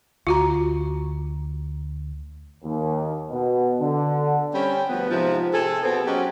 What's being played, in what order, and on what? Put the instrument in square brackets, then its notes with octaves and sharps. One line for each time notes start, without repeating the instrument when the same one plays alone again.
[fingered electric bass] D2 [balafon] F4 F#4 A#5
[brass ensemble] D#2
B2
D3
[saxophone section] G3 C4 C#4
D2 F3 B3
G#2 C3 F3
C3 G#4 A4
B2 B3 C4
F#3 G#3 C4 C#4 G4